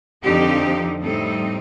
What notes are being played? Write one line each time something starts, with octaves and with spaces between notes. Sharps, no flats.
F2 D3 F3 C4 D#4 G4
A2 G3 C4 D#4 A4